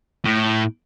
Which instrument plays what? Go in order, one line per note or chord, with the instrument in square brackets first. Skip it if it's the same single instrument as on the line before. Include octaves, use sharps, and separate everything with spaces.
[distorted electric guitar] A2